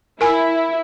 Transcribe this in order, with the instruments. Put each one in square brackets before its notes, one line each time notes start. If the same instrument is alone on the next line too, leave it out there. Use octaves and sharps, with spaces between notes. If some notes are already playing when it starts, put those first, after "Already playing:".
[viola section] E4 [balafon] A#4 G#5